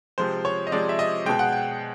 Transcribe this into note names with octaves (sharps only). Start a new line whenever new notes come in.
C3 F3 G#3 C5
C#5
D#5
C3 F3 G#3 D5
E5
D#5
B2 G#3 G5
F#5
G5